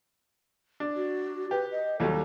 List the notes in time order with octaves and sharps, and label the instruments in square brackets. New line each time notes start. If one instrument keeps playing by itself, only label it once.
[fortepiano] D4
[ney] F#4
[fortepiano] G4 [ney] B4
[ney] D#5
[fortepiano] D#2 F#3 G3 [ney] A4